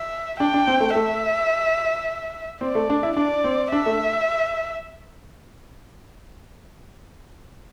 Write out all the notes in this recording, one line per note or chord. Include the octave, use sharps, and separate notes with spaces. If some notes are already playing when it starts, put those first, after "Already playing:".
Already playing: E5
D4 G5
D4
C4
A3
A3 E5
C4 D5
A3
D4
E4
D4 D5
C4
D4 E5
A3